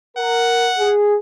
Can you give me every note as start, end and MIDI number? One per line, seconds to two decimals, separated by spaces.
0.17 0.69 70
0.17 0.94 78
0.77 1.17 68